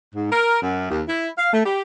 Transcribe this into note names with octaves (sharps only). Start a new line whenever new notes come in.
G#2
A#4
F#2
D#2
E4
F5
A3
G4